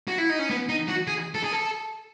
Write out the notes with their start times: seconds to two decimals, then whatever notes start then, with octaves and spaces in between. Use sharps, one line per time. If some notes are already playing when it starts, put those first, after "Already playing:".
0.08 F#4
0.18 E4
0.29 D#4
0.39 C#4
0.50 B3
0.69 D#4
0.88 F#4
1.07 G#4
1.35 A4
1.44 G#4
1.52 A4